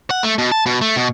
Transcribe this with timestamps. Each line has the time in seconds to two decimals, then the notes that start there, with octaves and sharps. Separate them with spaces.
0.10 F#5
0.23 A3
0.38 B2
0.52 A5
0.66 B2
0.81 A3
0.97 B2